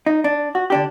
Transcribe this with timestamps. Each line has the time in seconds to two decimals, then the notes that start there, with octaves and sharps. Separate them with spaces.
0.06 D#4
0.24 D4
0.55 F#4
0.70 D3 D4 G4